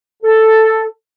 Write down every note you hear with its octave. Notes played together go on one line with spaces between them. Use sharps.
A4